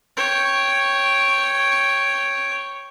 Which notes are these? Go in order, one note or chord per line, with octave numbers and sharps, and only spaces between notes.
C#5 G5